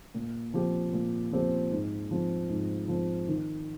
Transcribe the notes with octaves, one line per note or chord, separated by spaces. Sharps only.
A#2
F3 C4 G4
A#2
F3 C4 G4
G#2
F3 C4
G#2
F3 C4
D#3